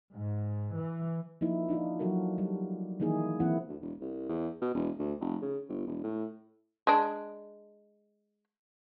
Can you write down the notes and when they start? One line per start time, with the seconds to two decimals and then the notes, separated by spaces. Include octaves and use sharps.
0.13 G#2
0.78 E3
1.41 F3 A#3 D#4 E4
1.68 D4 D#4 F4
1.99 F3 F#3 F#4 A4 A#4
2.38 G3
3.00 D#3 E3 A#3 D#4 E4 G#4
3.40 E3 A#3 C4 E4 F#5
3.68 D2
3.81 E1
4.01 C2
4.29 E2
4.62 B2
4.74 E1
4.99 D2
5.20 F1
5.42 C#3
5.69 G1
5.87 E1
6.04 A2
6.87 G#3 D4